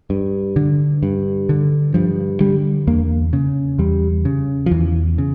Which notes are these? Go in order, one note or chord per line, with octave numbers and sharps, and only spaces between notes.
G2
D3
G2
D3
G2 F3
D3 G3
E2 A#3
C#3
E2 G3
C#3
F3
E2 E3
C#3